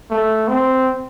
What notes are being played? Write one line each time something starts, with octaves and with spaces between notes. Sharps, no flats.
A3
C4